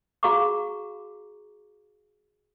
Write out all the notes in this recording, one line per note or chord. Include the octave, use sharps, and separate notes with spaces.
F#4 G#4 F5 A#5 C#6 D6